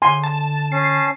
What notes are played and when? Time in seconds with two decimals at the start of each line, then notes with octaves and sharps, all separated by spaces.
0.02 D3 G#5 C6
0.23 A5
0.72 C#4 A5 C7